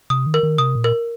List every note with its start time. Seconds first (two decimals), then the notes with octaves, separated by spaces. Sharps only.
0.10 C3 D#6
0.26 D#3
0.34 A#4
0.43 D#3
0.58 C3 D#6
0.75 A#2
0.84 A#4